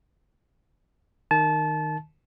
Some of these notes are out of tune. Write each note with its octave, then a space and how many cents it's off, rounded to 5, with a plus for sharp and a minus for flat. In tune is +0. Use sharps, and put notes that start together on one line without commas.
D#3 -10 A5 -25